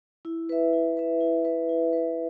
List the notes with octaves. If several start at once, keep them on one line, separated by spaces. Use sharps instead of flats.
E4
B4 E5
E4
B4 E5
E4
B4 E5
E4
B4 E5